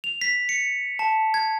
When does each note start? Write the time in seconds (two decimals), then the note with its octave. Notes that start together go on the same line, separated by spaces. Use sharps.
0.04 F7
0.21 B6
0.49 C#7
0.99 A5
1.34 G#6